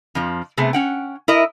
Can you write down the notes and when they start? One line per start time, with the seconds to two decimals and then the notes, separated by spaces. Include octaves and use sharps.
0.15 F2 F3
0.57 C3 A3 B3 G#4
0.73 C#4 F#5 G5
1.28 E4 A#4 D#5